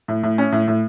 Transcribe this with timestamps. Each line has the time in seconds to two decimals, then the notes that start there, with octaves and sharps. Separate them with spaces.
0.08 A2
0.23 A2
0.38 C#4
0.52 A2
0.68 A2